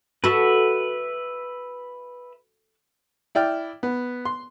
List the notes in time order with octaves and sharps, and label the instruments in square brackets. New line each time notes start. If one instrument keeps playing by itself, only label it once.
[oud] F#4 A4 [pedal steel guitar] B4 E5
[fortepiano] E4 D5 G5 F6
B3
C6